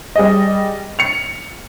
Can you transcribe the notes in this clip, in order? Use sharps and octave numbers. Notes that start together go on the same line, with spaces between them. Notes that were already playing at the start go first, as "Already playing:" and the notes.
G3 G#4 D#5
C#7 F7